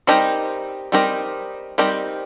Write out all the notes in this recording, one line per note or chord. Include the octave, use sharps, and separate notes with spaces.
G3 C4 D#4 G4 A#4
G3 C4 D#4 G4 A#4
G3 C4 D#4 G4 A#4